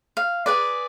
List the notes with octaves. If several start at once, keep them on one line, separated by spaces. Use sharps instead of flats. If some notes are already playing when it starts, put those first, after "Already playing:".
F5
G#4 B4 D5